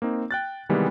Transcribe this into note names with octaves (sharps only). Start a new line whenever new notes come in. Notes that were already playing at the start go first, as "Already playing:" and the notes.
A#3 C4 D#4
G5 F#6 A6
C3 D#3 E3 G3 G#3 B3